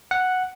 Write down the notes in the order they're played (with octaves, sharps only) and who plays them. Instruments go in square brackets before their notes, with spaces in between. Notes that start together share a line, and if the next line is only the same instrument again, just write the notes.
[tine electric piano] F#5